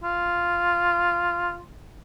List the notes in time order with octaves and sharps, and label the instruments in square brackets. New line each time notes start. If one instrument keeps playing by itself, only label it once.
[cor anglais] F4